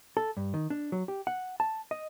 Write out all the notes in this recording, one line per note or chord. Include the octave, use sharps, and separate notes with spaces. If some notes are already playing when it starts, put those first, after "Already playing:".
A4
G2
D#3
D4
F#3
G4
F#5
A5
D#5